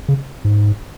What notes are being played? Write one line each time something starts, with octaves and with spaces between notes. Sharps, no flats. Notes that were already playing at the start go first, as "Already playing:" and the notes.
C#3
G#2